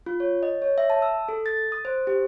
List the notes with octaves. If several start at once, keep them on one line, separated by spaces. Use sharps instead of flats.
F4
C#5
D#5
C#5
E5
A5
E6
A4
A6
D#6
C5
G4